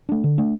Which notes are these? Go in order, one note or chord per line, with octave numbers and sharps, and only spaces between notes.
A3 D4
D3
A3 D4